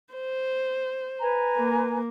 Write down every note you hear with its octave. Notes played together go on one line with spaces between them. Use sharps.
C5
B4 G#5 A#5
A#3